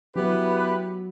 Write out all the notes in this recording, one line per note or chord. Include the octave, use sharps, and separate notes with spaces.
F#3 B3 E4 G4 B4